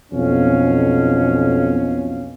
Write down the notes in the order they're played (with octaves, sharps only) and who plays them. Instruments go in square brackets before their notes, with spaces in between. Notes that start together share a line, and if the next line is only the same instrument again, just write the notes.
[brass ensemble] B1 F2 B2 C#4 F5